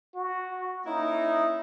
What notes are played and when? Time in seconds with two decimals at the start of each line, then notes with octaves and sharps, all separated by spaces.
0.15 F#4
0.86 A#3 C#4 D#4 E4